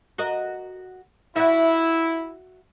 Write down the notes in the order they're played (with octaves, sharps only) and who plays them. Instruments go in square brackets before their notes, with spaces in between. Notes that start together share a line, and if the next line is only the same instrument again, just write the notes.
[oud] F#4 A#4 D#5
[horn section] E4 [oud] F#4 D5 E5